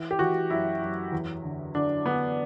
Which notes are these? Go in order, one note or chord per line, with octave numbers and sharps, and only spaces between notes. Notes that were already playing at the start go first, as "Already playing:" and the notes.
Already playing: E3
G4
E3 F#4
F#2 E4
F#2
E2
D3
D3 D4
D3 B3